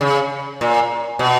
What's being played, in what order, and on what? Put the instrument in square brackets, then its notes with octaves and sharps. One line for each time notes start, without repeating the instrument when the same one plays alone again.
[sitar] C#3
A#2
B2